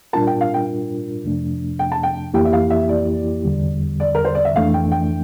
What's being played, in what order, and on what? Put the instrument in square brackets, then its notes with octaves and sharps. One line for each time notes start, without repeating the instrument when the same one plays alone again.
[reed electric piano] A#2 G3 D4 F4 A#4 [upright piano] A5
[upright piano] G5
F5
G5
[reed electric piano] F2 C3 F3 A3 D4
[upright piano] G5
A5
G5
[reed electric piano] F2 E3 A#3 E4 G4 [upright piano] G5
[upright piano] E5
F5
E5
D5
[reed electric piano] E2 D3 G3
[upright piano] D5
A#4
C5
D5
E5
[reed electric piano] F2 E3 A3 D4 [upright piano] F5
[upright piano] G5
G5